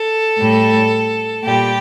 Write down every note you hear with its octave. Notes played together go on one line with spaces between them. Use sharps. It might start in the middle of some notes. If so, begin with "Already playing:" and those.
Already playing: A4
A2 G3
A#2 G3 G4